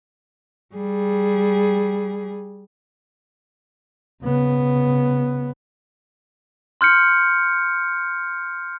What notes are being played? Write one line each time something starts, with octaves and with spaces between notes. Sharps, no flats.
G3 G#4
C#3 B3
C6 F6 G6 C#7